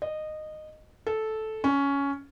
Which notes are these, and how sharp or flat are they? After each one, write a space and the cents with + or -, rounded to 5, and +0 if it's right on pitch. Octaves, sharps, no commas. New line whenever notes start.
D#5 -15
A4 -10
C#4 +10